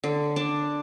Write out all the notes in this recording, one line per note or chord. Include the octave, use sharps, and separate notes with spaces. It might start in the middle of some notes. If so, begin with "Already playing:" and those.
D3
D4